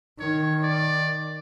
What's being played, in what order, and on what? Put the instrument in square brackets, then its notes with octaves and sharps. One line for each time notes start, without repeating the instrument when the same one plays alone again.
[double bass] D#3 [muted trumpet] C#5
[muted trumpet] D5